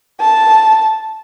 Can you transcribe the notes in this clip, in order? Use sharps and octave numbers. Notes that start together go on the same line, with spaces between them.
A5